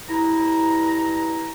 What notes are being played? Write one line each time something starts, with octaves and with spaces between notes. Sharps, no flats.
G2 E4 A#5